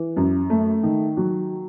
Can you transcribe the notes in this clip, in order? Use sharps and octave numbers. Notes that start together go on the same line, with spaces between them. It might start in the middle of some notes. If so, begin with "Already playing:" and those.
Already playing: E3
F#2
A3
D#3
F#3